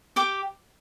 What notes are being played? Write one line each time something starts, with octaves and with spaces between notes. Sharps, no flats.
G4 D6